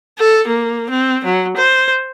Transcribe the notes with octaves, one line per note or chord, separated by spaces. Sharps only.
A4
A#3
C4
F#3
C5